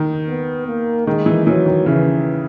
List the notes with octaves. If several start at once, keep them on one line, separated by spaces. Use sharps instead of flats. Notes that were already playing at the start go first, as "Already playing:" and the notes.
Already playing: D#3
B3
A#3
D#3 G#3
E3
E3 F#3
D#3
C#3 E3